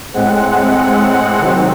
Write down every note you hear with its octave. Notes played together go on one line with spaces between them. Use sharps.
A2 G#3 C4 F#5
C3 D#3 F#3 C4